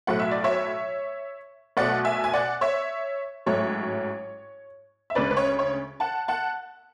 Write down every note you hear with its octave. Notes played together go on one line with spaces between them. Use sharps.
B1 A2 F#3 A3 F#5
E5
D5
C#5 E5
B1 B2 A3 D5 F#5
E5 G#5
G#5
D5 F#5
C#5 E5
A1 G#2 F#3 A3 C#5
E5
D2 C#3 G#3 B4 D5
B4
C#5
C#5
F#5 A5
F#5 A5